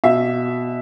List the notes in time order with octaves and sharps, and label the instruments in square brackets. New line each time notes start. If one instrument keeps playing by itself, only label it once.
[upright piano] B2 E5